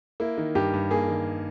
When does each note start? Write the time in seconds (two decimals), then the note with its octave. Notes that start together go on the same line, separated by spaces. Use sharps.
0.20 A#3 E4
0.38 D#3
0.55 G2 G4
0.74 G2
0.91 A#3 G#4
1.08 D#3